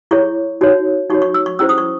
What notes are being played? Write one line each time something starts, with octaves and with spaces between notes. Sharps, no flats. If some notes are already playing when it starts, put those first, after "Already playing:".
E4 G#4 C#5 C#6
D#4 F#4 C#5
D#4 F#4 C#5 C#6
C#6
E6
C#6
C#4 E4 G#4 C5 E6
D#6
C#6